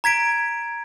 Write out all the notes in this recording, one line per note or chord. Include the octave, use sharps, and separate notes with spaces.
A#5 G#6 B6 D7